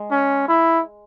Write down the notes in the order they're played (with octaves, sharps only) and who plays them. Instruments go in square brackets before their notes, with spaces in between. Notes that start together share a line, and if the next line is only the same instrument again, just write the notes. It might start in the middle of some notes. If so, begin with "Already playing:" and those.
Already playing: [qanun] G#3
[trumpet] C#4
E4